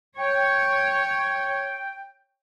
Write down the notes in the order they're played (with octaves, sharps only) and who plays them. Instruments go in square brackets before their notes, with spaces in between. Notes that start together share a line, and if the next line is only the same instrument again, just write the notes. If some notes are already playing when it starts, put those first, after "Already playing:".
[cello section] C#5 [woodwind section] G5